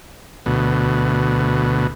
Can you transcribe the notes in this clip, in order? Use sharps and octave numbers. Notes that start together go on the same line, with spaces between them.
D2 B2